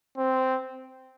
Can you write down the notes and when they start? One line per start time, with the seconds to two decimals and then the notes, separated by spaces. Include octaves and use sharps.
0.18 C4